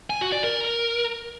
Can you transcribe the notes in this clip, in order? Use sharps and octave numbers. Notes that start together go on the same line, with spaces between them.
G#5
F#4
D5
A#4